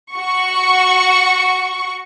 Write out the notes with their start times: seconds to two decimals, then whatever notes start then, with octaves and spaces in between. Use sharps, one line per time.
0.13 F#4 C#6